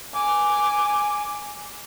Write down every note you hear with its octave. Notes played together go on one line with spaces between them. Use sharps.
G#5 D6